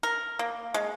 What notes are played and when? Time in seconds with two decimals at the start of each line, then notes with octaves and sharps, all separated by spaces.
0.03 A#4
0.39 A#3
0.74 G#3